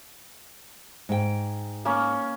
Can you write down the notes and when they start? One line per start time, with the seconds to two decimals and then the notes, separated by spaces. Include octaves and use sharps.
1.09 G#2 G5
1.85 A#3 C#4